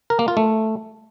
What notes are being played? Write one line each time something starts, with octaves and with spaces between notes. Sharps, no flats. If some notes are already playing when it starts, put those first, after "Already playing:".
A#4
A#3
F4
A3